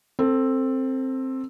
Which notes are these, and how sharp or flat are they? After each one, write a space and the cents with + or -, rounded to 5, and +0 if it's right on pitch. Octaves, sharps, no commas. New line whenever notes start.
C4 +10 A4 +20